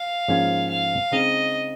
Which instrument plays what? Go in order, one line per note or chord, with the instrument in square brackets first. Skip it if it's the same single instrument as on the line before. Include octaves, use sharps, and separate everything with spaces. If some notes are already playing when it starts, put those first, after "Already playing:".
Already playing: [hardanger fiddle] F5
[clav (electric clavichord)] G#2 F3 A#3 C#4 F4
[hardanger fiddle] F5
[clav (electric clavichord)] C#3 G#3 C4 D#4 [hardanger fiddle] D#5